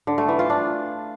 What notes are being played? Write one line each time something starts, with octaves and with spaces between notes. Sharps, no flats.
D3
A3
E3
F4
D4